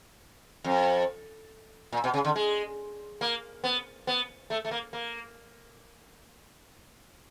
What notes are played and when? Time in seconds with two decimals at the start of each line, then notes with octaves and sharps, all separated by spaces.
0.64 F2
1.92 A#2
2.04 B2
2.14 C#3
2.25 D3
2.36 G#3
3.21 A#3
3.64 B3
4.07 B3
4.50 A3
4.65 A3
4.71 A#3
4.93 A#3